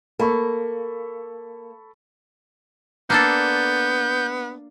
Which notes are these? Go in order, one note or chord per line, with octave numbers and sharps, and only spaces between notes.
A#3 A4 B5 C#6
A#3 B3 D4 A4 G6